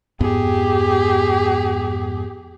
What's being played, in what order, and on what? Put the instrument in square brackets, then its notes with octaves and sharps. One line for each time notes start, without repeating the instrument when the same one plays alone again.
[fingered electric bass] F2 G#2 B3 [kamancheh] G4 G#4